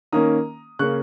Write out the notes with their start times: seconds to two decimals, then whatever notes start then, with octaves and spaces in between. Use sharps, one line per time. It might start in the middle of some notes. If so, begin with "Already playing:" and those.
0.12 D#3 A#3 C#4 A#5 D#6
0.79 C#3 A#3 C#4 C#6 F#6